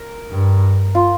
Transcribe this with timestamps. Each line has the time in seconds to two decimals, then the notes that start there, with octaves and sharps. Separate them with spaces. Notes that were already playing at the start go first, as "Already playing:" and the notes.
Already playing: A#4
0.31 G2
0.95 F4